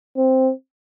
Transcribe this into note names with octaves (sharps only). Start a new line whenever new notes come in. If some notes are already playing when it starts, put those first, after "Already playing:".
C4